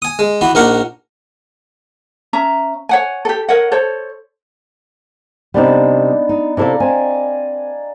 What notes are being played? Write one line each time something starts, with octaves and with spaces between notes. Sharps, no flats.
G#5 D#6
G#3
E3 B3 F#4
A#1 D#4 A#4 F#5 C#6 D6
C#4 E5 A#5
C#5 F#5 G#5
G4 A4
A#4 C#5 D#5 F#5
A4 C5 C#5
C3 G3 B3 D4 D#4
D#4
C3 E4 A4 D5 F5 A#5
C4 G#5